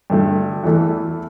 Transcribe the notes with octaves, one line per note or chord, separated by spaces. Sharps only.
G2 D3 A3 D4
E2 E3 A3